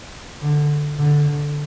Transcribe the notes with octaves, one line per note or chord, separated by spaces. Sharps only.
D3
D3
D3